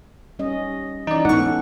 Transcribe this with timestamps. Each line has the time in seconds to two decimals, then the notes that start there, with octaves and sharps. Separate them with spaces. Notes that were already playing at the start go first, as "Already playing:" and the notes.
0.39 G3 C#4 D#5
1.07 E3 C#4 D#4 D5
1.25 G#2 B3 C#4 A4 F#5 C#6